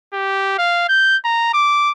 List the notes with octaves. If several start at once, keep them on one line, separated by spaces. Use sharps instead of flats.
G4
F5
G6
A#5
D6